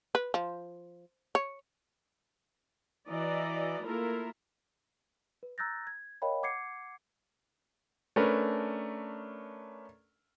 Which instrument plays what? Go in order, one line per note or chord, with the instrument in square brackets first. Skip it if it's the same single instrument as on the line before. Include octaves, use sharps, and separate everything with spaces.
[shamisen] B4
F3
C#5
[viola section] E3 E4 F#4 D5 D#5 A#5
A3 A#3 E4 F4 A#4
[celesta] B4
A#5 E6 F#6 G6 A6 A#6
G#6
A#4 C#5 D#5 F5 G5 B5
F#5 D6 G#6 C7 C#7
[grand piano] A3 C#4 D4 A#4 B4